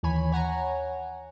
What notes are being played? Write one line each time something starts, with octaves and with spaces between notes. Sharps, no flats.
D#2 E3 C#5 G#5 B5
C#5 F#5 G#5 A#5